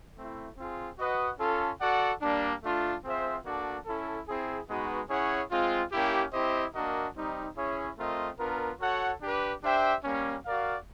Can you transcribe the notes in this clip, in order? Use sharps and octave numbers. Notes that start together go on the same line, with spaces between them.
A3 C4 E4
C4 F4 G#4
F#4 B4 D#5 F#5
C#4 F4 A4
F#4 A4 D5 F#5
G3 A#3 D4
A3 D4 F4
C4 F4 G#4 C5 E5
A#3 D4 F#4 A4 D5
C#4 E4 A4
C4 E4 G#4
G#3 B3 D#4 F#4 B4
C#4 E4 G#4 C#5 F#5
G#3 C4 F4
A#3 C#4 E4 G4
C4 E4 G4 C5 D#5
A#3 D4 F#4 A#4 D#5
G3 C4 D#4
C#4 E4 G#4 C#5 E5
A3 C4 F4 A#4 D#5
B3 D4 F4 A#4
F#4 A4 C#5 F#5
D4 G4 B4
D4 G4 C5 E5 G5
G3 A#3 C#4
F#4 A#4 D5 F5